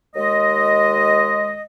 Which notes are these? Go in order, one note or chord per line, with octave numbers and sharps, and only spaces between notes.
D#2 G#3 D#5